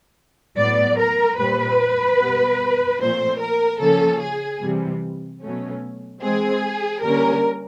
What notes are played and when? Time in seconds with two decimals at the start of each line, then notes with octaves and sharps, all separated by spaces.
0.57 A2 F#3 B3 D5
0.98 A#4
1.38 A#2 G3 C4 B4
2.19 B2 G3 B3
3.00 A#2 F3 A3 C4 C5
3.39 A#4
3.80 C#3 F3 A#3 C#4 A4
4.21 G#4
4.61 C3 E3 G3
5.42 B2 F#3 A3 C#4
6.22 E3 G#3 C4 G#4
7.03 D3 G3 A#3 C#4 A#4